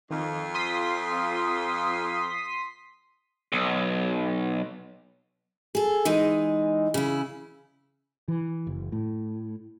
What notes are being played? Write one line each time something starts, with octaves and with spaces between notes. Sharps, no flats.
F2 D#3 F4
C6 D#6 B6
B1
G#4 A4
E3 G#3 D#4
C#3 E4
E3
F#1
A2